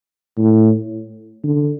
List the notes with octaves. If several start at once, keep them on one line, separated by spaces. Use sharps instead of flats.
A2
D3